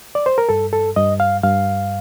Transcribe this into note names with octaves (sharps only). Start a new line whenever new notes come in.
D5
C5
A#4
G2 A4
A4
G2 D#5
F5
G2 F5